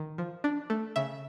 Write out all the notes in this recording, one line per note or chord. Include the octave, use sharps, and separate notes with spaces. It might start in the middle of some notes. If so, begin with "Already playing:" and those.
Already playing: D#3
F3
D4
A3
C#3 E5